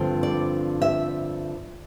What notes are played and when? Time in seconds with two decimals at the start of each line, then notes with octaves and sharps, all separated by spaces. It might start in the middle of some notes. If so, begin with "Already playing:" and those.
Already playing: G2 D3 F3 C4
0.23 D5
0.82 E5